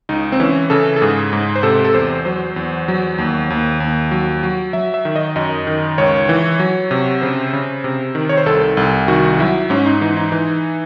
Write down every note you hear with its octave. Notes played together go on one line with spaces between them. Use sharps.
C#2 D#4
C4
E3 C#4
C#3 A4
A4
G#2 G#4
G#2
C5
C3 A4
A4
E2 C5
F#3 C5
E2
F#3
D#2
D#2
D#2
F#3
F#3
F#3 E5
E5
D#3
D#5
F#2 D#5
D#3
C#2 C#5
E3
F#3
C3
C#3 C5
C#3
C3
D#3
C#5
C5
C2 A4
C2
D#3 F#4
F#3 E4
G#2 C#4
D#4
E3 D#4
D#4
E3 D#4